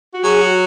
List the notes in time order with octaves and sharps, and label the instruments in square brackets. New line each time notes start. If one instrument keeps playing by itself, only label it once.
[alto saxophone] F#4
[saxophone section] F#3 [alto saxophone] G#4
[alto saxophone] F#4